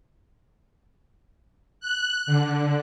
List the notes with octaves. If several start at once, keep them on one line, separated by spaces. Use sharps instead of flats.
F#6
D3